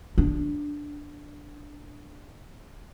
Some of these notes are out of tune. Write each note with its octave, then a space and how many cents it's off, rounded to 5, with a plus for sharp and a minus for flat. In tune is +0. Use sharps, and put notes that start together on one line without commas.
D4 +0